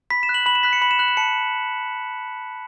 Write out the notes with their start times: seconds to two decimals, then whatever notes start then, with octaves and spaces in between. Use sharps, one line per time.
0.10 B5 B6
0.23 E7
0.29 F#6
0.34 F#7
0.46 B5 F#7
0.55 E7
0.63 F#6 B6
0.73 C#7
0.82 B5 F#7
0.91 E7
0.99 F#6 F#7
1.08 E7
1.17 A5 C#7